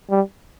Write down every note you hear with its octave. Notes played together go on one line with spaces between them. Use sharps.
G3